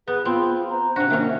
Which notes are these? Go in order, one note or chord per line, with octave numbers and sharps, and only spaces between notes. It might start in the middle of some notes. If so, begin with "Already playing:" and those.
B3 G#4 B4
B3 C4 F4
C5 A#5
C3 D4 F#4 C5
D#3 A#3 C#4 E5